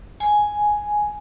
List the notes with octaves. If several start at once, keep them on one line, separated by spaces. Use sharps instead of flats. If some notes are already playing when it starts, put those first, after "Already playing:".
G#5